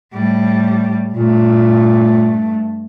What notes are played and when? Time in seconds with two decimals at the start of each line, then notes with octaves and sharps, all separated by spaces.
0.14 A2 G3
1.14 G2 A#2 A3